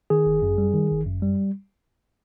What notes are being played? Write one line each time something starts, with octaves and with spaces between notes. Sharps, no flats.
D#3 G#4
G1
F#2
G3
D#3
G1
F#2
G3